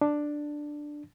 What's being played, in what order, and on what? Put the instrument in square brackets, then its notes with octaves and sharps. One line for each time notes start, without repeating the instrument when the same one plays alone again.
[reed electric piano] D4